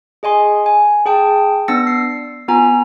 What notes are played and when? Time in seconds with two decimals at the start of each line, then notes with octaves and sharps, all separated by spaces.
0.23 G#4 D#5 G#5 C6
0.66 G#5
1.06 G#4 G5 A5
1.68 B3 D4 E6 A6 A#6 C#7
1.87 C7
2.48 B3 F4 G#5 A#5